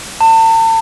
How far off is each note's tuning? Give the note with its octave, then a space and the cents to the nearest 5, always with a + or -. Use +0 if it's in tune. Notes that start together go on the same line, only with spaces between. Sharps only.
A5 +40